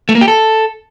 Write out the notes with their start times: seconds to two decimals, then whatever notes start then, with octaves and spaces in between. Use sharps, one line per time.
0.09 A3
0.15 A#3
0.21 G4
0.28 A4